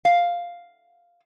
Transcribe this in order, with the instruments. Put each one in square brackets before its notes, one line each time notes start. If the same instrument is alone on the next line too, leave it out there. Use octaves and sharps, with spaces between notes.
[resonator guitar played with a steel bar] F5